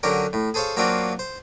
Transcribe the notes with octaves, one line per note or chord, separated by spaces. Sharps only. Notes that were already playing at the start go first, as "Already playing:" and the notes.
D3 F#3 C#4 G4 A#4
A2
G#4 A4 C5 C#5 F5
F#3 A#3 C4 D4 F4 F#4
C5